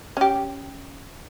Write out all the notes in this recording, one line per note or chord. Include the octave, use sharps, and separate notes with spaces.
C#4 G4